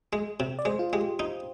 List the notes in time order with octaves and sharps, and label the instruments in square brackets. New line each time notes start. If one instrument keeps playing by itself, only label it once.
[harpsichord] G#3
C3
[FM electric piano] D5
[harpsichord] G#3 [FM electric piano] C5
[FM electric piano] F4
[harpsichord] G#3 [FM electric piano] G4
[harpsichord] D#4